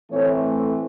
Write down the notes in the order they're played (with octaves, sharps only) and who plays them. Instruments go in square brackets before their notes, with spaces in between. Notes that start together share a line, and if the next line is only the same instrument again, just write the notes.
[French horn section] A2 E3 A3 C4 C#5